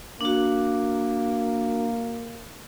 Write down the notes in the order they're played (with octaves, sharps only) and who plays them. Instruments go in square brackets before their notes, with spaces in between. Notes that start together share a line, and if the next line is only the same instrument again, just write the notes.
[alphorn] A#3 [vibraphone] D4 F#4